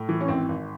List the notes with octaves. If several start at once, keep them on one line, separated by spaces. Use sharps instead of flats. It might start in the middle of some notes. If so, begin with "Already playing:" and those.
Already playing: A2
E3
C#4
G#1 C4
G#1